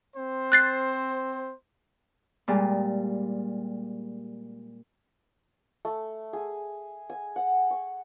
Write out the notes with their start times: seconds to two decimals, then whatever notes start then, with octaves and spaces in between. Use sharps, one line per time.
0.16 C4 C5
0.52 F#6 A6 C7
2.48 A#2 G3 G#3 A#3
5.85 A3
6.33 G#4
7.10 G#5
7.36 F#5
7.70 C#6